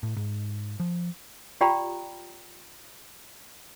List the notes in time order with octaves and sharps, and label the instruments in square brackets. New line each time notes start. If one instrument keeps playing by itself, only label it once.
[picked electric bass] A2
G#2
F3
[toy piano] F4 G4 D5 G5 A#5 B5